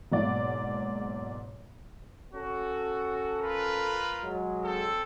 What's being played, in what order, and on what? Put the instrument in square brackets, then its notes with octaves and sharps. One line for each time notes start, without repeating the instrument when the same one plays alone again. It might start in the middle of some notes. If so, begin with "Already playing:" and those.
[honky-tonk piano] F#1 G#2 B2 D5 F#5
[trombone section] C#4 A4 [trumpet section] F#4
[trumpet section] F4 A#4 B4
[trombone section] F#3 G#3
[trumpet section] C4 A4